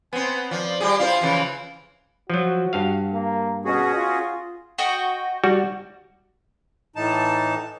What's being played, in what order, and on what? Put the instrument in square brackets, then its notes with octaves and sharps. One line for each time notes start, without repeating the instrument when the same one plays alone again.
[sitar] B3 C4 [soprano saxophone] G#5
[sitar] F3 [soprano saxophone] D5
[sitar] G3 G4 G#4
[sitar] E4 F4 C5 [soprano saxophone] F5
[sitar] C#3 E3 F3
[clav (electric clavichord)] F3 F#3 [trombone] F#4
[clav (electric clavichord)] G2 F5
[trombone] A#3
[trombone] B2 [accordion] C#4 F#4 G#4
[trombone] F4
[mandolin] F#4 D#5 G5
[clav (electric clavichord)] G3 F#4
[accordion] A2 E3 D#4 A5